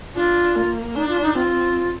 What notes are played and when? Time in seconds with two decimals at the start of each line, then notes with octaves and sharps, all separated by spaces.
0.15 D4 F4
0.55 A#3
0.95 D4 D#4
1.08 F4
1.21 D#4
1.34 C4 F4